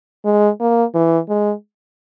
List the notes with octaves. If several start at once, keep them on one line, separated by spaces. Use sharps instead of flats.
G#3
A#3
E3
G#3